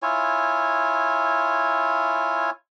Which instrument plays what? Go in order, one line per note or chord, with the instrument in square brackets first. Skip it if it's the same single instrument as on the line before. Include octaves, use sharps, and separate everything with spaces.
[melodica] E4 F4 C#5 G#5